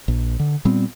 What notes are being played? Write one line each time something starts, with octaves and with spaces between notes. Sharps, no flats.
A#1
D3
A#2 G3 B3 C4